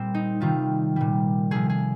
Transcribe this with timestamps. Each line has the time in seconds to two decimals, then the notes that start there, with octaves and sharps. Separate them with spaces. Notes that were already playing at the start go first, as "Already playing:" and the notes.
Already playing: A#2 G3 C4
0.14 D#4
0.41 C3 D#3 G3 F4
0.96 A#2 G3
1.51 C3 F3 G#4
1.69 G#4